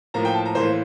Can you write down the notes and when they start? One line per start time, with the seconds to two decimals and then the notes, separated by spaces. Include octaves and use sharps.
0.14 A2 F3 A#3 A#5
0.25 G5
0.34 A5
0.45 A#5
0.55 A2 E3 A#3 C5